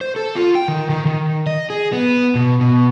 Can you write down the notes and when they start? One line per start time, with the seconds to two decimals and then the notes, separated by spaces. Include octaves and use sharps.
0.01 C5
0.16 A4
0.36 F4
0.55 G5
0.68 D#3
0.90 D#3
1.06 D#3
1.47 D#5
1.70 G#4
1.93 B3
2.35 B2
2.61 B2